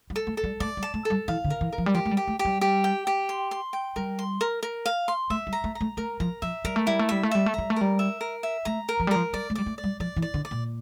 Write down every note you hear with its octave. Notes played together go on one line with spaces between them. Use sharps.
G3
A4
A3
A4
G3
A3 D5
G3
A5
A3
G3 A4
E3 F5
D3
A#4
E3
A#4
F3
G3
F3 G4
A3
G3
G4
A3
G4
G3
G4
G5
G4
C6
C6
G5
G3 A#4
C6
A#4
A#4
F5
C6
A3 E5
G3
A#5
A3
A#5
A3
A3 A#4
F3 A#5
F3 E5
G3 A#4
A3
G3 E4
A3
G3 E5
A3
G3 E5
A3
G3 A#5
A3
G3 A#4
E5
A#4
E5
A3 A#5
A#4
F3
G3
F3 A#4
G3 D5
A3
G3 D5
A3
D5
G3
F3 D5
E3
D5
D3
D5
A#2